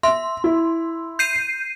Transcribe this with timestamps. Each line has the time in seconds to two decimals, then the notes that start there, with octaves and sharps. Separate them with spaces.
0.03 E5 C6
0.44 E4
1.19 G6 C7 D#7